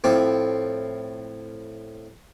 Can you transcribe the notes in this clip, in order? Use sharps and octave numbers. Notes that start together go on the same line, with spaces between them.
A2 F3 C4 D6